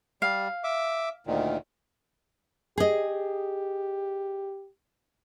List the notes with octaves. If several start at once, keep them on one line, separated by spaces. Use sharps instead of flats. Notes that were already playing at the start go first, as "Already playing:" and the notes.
G3 F5
E5 D6
D2 A#2 D#3
G4 G#4 D#5